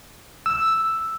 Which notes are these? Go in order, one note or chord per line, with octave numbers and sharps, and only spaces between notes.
E6